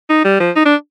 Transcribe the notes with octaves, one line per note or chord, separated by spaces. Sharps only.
D#4
G3
F3
D#4
D4